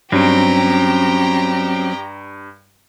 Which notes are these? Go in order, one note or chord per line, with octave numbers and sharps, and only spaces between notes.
G2 F#3 C4 C#4 G4 A#5